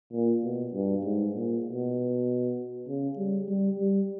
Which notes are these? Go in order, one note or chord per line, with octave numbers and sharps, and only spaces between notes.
A#2
B2
G2
G#2
A#2
B2
C#3
G3
G3
G3